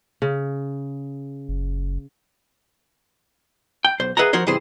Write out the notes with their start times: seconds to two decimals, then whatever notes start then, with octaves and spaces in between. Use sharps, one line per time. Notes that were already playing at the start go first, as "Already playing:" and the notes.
0.22 C#3
1.48 F#1
3.85 G5
4.00 B1 C5
4.17 G#4 B4 D#5 E5 F#5 A#5
4.33 F3 F#4 A#4 C5 C#5
4.47 G2 C3 E3 G#4 C5